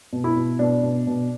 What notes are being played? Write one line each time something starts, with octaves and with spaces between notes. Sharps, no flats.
B2
E4
B2
B2 D4
B2
B2